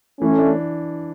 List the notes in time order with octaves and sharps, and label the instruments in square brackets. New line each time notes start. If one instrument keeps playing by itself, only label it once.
[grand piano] E3 [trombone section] A3 C#4
[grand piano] D4